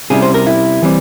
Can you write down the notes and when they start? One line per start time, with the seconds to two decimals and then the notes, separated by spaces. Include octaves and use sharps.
0.10 C3 G3 C#4 E4 G#4
0.22 C5
0.34 A#4
0.47 E4
0.82 E3 G3 C4